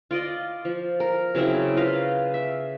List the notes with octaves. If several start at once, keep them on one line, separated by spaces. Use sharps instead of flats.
F4 D5 D#5
F3
A#4
C#3 F#3 C4 E4
F4 B4 D#5 F5
E5